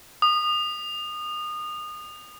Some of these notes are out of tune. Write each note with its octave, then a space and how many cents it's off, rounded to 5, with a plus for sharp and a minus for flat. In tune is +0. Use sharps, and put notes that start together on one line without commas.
D#6 -30